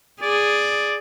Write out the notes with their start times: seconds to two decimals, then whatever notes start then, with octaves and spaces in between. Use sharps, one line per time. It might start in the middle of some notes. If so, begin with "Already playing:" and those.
0.21 G#4 D5